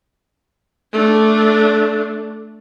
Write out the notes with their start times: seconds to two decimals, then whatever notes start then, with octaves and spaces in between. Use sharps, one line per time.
0.93 A3 D4